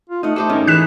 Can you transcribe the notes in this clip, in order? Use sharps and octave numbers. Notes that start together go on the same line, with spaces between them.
F4
A3 D#4 D#5 F#5
A3 G4 A4 C5 D#5
G#2 D#3 C#4 A#4
E3 D#4 E4 G#4 B4 F#6 B6 E7